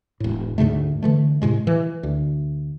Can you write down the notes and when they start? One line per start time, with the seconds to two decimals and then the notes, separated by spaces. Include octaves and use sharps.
0.20 E1 A2
0.58 D2 G#2 C#3 A3
1.03 D3 E3 A3
1.42 A2 C3 G#3
1.67 E3
2.03 D2